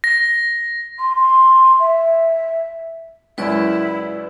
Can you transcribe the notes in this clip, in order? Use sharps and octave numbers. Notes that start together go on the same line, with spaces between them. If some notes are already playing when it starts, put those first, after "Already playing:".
A#6
C6
C6
E5
C#2 F#2 E4 B4 D5 E6